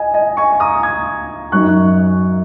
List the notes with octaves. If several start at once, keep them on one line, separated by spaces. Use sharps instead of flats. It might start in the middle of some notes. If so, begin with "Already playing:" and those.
Already playing: D#5 G#5
D#5 G#5
G#5 C#6
A#5 D#6
D#6 G#6
F#2 F#3 D#4 C#6 F#6